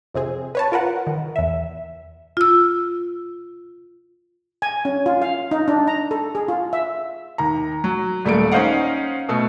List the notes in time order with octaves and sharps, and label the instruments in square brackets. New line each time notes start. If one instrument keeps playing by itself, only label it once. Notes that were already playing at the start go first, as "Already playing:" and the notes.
[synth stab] F2 C3 C4 G#4
B4 C#5 A5
F4 A#4 B4 F#5
D#3
E2 E5
[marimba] F4 E6
[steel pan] G#5
C#4
F4
F5
D#4
D4
A#5
A4
G#4
F4
E5
[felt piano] D#2 A#5
F#3
D#1 G3 A3 A#3 D7
C#4 D#4 C5 D#5 F5 F#5
B2 A3